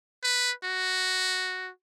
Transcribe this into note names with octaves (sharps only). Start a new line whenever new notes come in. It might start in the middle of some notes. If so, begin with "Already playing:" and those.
B4
F#4